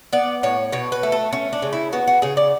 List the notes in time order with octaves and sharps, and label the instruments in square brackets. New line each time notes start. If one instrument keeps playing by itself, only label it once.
[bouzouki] B3 D5
A2 C#5
B2 C#5
B4
A3
A4
A3 C#4
D4
C#3
E4
B3 F#4
F#4
C#3 G#4
D5